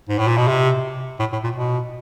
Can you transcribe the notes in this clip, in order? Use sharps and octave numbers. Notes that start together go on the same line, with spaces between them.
G#2
A2
A#2
B2
C3
A2
A2
A#2
B2